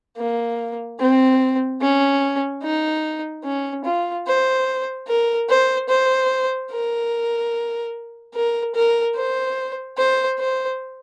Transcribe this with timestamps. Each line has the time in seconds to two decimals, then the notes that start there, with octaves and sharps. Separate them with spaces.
0.17 A#3
0.99 C4
1.80 C#4
2.63 D#4
3.44 C#4
3.85 F4
4.26 C5
5.07 A#4
5.49 C5
5.89 C5
6.71 A#4
8.34 A#4
8.75 A#4
9.16 C5
9.97 C5
10.39 C5